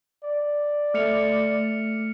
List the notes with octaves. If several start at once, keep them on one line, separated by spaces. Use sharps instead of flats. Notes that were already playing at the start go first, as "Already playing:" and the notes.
D5
A3 F6 C#7 F7